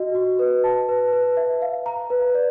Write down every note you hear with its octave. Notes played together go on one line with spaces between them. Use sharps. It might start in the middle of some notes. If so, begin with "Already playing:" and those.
Already playing: F#4 D#5
F#4
B4
A5
B4
B4
E5
F5
A#5
B4
D5